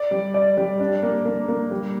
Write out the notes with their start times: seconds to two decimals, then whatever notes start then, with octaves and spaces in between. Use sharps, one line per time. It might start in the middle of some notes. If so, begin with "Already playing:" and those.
Already playing: D5
0.11 G3
0.34 D5
0.57 G3
0.80 D4
1.03 A#3
1.25 A#3
1.48 A#3
1.71 G3